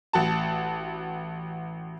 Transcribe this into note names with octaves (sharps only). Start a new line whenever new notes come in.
A1 F#4 A5